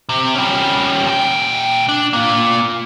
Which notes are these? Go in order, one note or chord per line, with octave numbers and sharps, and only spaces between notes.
C3
G3 C#4
A#2 G5
D4
A#3 F4